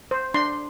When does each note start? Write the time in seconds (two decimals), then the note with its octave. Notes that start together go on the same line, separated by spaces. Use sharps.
0.11 C5
0.34 D4 C6